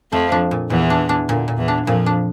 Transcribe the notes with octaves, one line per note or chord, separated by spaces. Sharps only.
F2 F3 A3
D4
A#2
E2 A#2 E3
D4
D4
A#2 D3
A#2
E2 E3
D4
F2 A#2 F3
D4